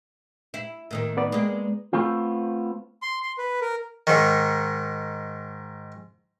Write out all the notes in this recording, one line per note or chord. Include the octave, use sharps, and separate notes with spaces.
E4
A2 D#3 A#3
B3 B4 D5
G#3 A#3
A3 B3 C4 F4
C6
C6
B4
A#4
G#2 D#3